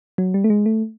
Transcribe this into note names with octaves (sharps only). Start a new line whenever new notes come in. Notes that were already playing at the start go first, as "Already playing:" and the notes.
F#3
G3
A3
G#3
A3